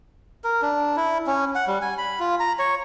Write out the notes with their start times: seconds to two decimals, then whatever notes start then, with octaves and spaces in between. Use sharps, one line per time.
0.44 A#4
0.62 D4
0.97 E4
1.27 C#4
1.55 F#5
1.68 G3
1.82 G#5
1.98 B5
2.20 F4
2.40 A#5
2.59 C#5